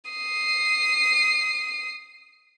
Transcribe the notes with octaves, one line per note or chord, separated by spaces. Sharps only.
D#6 C7